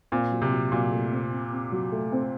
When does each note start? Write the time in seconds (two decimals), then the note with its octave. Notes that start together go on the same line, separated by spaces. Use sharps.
0.12 A#2 C4
0.32 F#3
0.42 C3
0.52 F#3
0.72 A#2 F#3
0.92 A3
1.12 C4
1.32 C3
1.53 C4
1.72 F#3
1.92 A3
2.12 C4